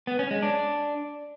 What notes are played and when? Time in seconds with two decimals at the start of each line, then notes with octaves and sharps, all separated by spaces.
0.07 B3
0.19 C#4
0.31 G#3
0.42 D4